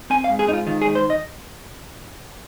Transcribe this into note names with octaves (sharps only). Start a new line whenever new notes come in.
C4 G#5
F5
G#2
G#4
G#2 D#4
F4
D#3 F4
G#4
G#2
C5
D#5